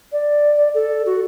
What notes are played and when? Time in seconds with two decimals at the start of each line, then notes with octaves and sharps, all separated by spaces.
0.12 D5
0.74 A4
1.06 F#4